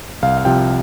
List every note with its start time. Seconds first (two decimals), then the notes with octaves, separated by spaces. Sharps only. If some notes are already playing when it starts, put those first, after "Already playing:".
0.23 C2 F5
0.38 F5
0.45 C3 F3 G5